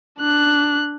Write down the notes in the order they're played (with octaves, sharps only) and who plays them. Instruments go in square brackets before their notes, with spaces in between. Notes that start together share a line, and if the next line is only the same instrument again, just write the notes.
[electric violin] D4 F#6